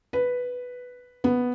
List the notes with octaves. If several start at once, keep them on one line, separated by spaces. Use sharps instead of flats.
B4
B3